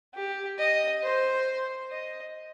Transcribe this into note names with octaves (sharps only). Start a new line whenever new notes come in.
G4
D#5
C5
D#5